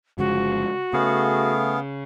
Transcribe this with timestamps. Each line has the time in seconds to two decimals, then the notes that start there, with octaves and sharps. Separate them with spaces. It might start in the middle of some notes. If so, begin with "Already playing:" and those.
0.18 G1 C#3 F3 G#3 F#4
0.93 C#3 A3 B3 G#4 F5